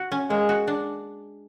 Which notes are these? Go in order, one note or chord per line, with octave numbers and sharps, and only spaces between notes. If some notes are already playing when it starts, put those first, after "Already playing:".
Already playing: F#4
C#4
G#3 A#3
F#4
D4